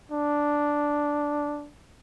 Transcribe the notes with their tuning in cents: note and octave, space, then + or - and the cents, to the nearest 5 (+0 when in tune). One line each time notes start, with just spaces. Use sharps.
D4 -5